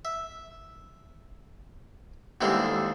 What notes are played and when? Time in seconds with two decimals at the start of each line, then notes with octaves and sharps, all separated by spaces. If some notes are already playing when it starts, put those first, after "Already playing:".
0.05 E5
2.41 D#2 D3 E3 G3 G#3 C4